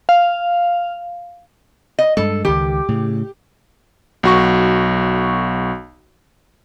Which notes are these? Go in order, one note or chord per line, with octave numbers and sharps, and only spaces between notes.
F5
D#5
G2 G#3 A4
C#2 D#3 G4
A2 C#3
B1 F#4 C#6